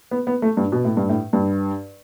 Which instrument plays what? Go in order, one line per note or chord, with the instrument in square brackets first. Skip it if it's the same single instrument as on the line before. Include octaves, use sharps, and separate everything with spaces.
[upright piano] B3
B3
A3
G2
B2
A2
G2
A2
G2